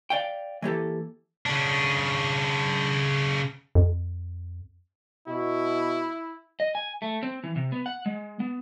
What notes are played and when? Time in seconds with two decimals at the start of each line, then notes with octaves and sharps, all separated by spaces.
0.10 D5 F5 G5
0.62 E3 A#3 G4 A4
1.46 C#3 D4
3.75 F2
5.28 B2 E4
6.60 D#5
6.75 G#5
7.02 A3
7.23 C4
7.44 E3
7.56 C3
7.72 B3
7.86 F#5
8.06 G#3
8.40 B3